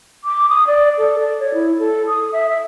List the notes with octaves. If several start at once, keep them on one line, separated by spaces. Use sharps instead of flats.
D6
D#6
D5
A4
D5
C#5
E4
A4
D#6
E5
E5